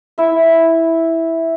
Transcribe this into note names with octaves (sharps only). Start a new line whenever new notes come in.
E4 E5